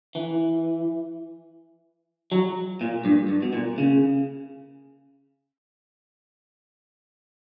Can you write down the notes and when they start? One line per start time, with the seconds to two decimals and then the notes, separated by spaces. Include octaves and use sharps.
0.15 E3
2.32 F#3
2.81 A#2
3.05 G2
3.28 G2
3.42 B2
3.53 A#2
3.78 C#3